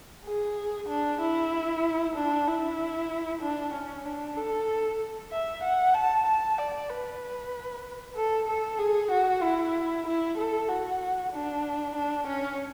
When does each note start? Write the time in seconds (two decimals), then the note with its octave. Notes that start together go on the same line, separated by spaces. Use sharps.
0.26 G#4
0.88 D4
1.21 E4
2.15 D4
2.47 E4
3.41 D4
3.74 C#4
4.05 D4
4.37 A4
5.32 E5
5.63 F#5
5.94 A5
6.26 A5
6.58 D5
6.90 B4
8.16 A4
8.48 A4
8.79 G#4
9.11 F#4
9.43 E4
10.06 E4
10.38 A4
10.69 F#4
11.32 D4
11.95 D4
12.27 C#4